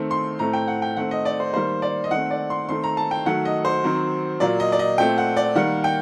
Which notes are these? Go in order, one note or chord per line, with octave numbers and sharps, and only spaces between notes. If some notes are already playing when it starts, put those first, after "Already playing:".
Already playing: D#3 A3 C4
C6
A2 A3 C4 A#5
G5
F#5
G5
D#3 A3 C4 F#5
D#5
D5
C5
D#3 G3 A#3 C5
D5
D#5
D#3 A3 C4 F#5
D5
C6
D#3 A3 C4 C6
A#5
A5
G5
D#3 F#3 A3 F#5
D#5
C5
D#3 F#3 C4
A#2 F#3 A#3 D5
D#5
D5
D#5
A#2 A3 C4 G5
F#5
D5
D#3 G3 A#3 F#5
G5